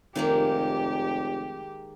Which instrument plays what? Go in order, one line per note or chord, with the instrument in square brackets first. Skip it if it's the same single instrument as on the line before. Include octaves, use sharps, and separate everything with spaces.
[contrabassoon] F1 [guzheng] D#3 G#3 A#3 [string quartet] G4